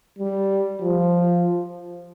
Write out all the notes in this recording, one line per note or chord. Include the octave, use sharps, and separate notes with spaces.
G3
F3